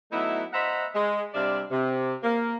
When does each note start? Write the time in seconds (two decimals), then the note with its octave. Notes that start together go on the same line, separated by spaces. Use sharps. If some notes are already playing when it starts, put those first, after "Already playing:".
0.12 F#3 A3 B3 D#4 E4
0.53 C5 D#5 E5 F#5 A#5 B5
0.95 G#3
1.34 C3 G3 D4 D5 E5 F5
1.71 C3
2.23 A#3